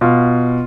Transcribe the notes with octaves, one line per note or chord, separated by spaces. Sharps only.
B2 F4